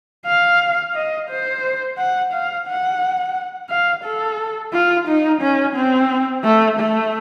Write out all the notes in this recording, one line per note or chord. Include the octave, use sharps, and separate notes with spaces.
F5
D#5
C5
F#5
F5
F#5
F5
A4
F4
D#4
C#4
C4
A3
A3